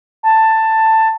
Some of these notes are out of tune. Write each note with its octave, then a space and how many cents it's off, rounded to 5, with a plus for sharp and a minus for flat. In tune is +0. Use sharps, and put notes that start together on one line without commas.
A5 +10